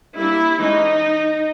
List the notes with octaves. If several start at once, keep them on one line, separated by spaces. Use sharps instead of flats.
G3 A#3 D4 E4
E3 G#3 C#4 D#4